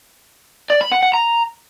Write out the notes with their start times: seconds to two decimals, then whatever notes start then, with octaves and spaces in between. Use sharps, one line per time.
0.70 D5
0.81 B5
0.92 F#5
1.03 F#5
1.14 A#5